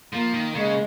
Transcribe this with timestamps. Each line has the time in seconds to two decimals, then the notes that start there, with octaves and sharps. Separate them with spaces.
0.13 F3 A#3
0.34 D#3
0.55 C#3 G#3